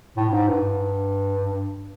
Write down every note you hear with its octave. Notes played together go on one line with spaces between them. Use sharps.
A2
A2
G#2
G2